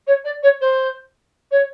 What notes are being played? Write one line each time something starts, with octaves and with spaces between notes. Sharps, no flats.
C#5
D5
C#5
C5
C#5